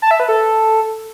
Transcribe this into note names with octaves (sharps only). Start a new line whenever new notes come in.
A5
E5
B4
A4